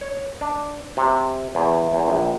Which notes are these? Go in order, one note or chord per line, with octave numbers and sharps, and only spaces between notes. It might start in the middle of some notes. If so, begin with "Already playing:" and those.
C#5
D4
C3
E2
E2
A#1